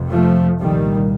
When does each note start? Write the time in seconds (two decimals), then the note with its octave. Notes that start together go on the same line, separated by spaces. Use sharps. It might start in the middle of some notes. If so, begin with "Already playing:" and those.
Already playing: F1 F2 C3
0.11 F3 A3
0.60 C2 A#2 D#3 G3